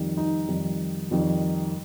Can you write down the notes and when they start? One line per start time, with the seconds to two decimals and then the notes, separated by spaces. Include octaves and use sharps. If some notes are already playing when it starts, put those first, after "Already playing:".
Already playing: F2 D#3 G3
0.17 D#4
0.48 F2 D#3 G3
1.11 F2 D#3 G3